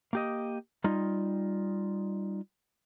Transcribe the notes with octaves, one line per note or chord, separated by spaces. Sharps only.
A#3 G4 D#5
G3 D#4 F4 D#5